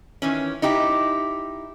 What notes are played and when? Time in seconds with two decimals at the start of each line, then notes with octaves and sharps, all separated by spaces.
0.22 D#3 E3 C#4
0.62 D#4 E4 G4